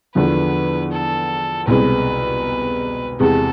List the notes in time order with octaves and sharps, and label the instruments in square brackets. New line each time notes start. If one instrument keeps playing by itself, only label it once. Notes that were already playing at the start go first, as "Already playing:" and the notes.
[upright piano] E2 D3 F3 B3 [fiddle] B4
[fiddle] A4
[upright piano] C2 B2 G#3 C4 [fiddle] B4
[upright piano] E2 C3 G#3 [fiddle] A4